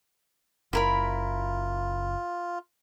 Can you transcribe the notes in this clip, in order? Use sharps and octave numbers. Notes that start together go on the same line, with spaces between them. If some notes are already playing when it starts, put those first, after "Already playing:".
F#1 E4 F4 A#4 B5